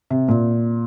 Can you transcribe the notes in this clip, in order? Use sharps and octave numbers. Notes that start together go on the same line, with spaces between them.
C3
A#2